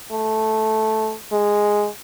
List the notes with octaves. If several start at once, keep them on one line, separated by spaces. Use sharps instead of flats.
A3
G#3